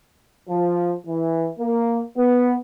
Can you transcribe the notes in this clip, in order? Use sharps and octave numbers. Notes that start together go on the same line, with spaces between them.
F3
E3
A#3
B3